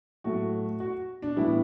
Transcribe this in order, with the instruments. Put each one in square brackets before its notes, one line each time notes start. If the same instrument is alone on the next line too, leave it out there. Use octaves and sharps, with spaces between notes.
[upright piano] A2 F#3 A3 F#4
F#4
D4
A2 E3 G3 B3 E4